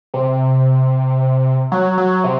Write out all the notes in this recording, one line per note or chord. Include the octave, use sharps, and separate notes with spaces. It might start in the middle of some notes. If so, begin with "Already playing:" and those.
C3
F#3
F#3
C3